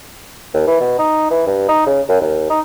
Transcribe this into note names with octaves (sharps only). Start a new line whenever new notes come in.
D#2
E3
B2
D#4
E3
G2
D#4
C#3
F#2
D#2
D#4